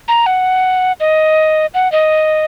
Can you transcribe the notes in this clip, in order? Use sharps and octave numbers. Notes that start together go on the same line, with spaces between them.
A#5
F#5
D#5
F#5
D#5